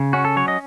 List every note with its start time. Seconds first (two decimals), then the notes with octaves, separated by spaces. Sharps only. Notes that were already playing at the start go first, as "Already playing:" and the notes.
Already playing: C#3
0.13 C#4 F#4
0.25 A4
0.36 F#3 C#5
0.48 D#5